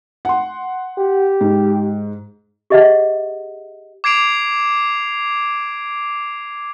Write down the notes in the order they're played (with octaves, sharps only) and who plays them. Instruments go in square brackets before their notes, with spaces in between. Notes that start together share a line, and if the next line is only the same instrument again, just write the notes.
[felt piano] F#5 C6
[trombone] G4
[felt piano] G#2
[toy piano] G4 G#4 D#5 E5 F#5
[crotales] D6 G#6 C7 D7 F7